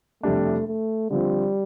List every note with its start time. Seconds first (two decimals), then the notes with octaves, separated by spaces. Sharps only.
0.23 F2 C3 G3 A3 D4
0.67 A3
1.10 D3 F3 G3 C4 F4